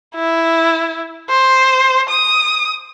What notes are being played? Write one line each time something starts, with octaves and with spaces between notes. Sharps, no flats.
E4
C5
D#6